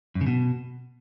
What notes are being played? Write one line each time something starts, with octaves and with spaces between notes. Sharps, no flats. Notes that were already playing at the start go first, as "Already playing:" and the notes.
F#2
C#3
B2